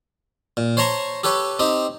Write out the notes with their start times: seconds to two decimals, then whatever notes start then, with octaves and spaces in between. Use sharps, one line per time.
0.57 A#2
0.77 C5 C#5 A5 A#5 C6 C#6
1.24 G4 A4 B4 C#5
1.59 C4 D#4 G4